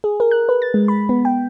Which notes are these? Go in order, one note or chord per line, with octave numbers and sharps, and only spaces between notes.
G#4
A#4
F#6
B4
A6
G#3
B5
B3
G5